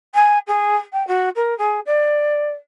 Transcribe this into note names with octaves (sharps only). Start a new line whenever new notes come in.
G#5
G#4
G5
F#4
A#4
G#4
D5